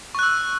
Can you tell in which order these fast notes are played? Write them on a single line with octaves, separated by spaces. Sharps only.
C#6 F#6 E6